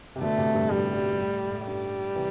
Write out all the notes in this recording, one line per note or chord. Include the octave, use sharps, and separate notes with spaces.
C3
B2 D3 A3
A2 C3
G2 B2
A2 G3
A2
A2
G2 G3
C3 E3